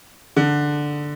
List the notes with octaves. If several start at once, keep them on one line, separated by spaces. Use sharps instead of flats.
D3